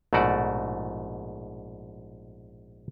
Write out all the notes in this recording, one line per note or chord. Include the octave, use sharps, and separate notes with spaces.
A#1 G#2 B2 A3 F#4 D5